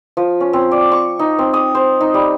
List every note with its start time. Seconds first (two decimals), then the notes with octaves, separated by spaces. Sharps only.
0.17 F3
0.40 C#4
0.53 C4
0.71 D5
0.92 C#6
1.19 D#4
1.39 C4
1.54 D#6
1.75 C5
2.01 D#4
2.14 G3